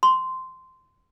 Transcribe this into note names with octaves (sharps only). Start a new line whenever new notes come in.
C6